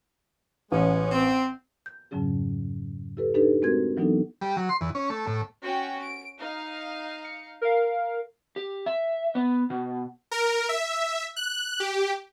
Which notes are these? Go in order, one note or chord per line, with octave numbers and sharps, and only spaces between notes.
A1 G#3 B3 C#4
C4
G6
F2 G#2 C#3 F#3 C#4 G#4
E4 G4 A4 B4
D4 D#4 G4 A4 B4
G#3 A3 C4 F#4 A#4 G#6
E3 F#3 B3 D4 D#4 A4
G3
F#3
C6
E2
C#4
A3
A2
C#4 F#4 G5
D7
D#4 F5
C#7
A#4 F5
G4
E5
B3
B2
A#4
E5
F#6
G4